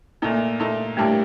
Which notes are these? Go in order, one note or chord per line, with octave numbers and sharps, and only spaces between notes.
A#2 A3 A#3 D#4 A4
A#2 A3 D#4 A4
A2 G3 A3 A#3 D4 A4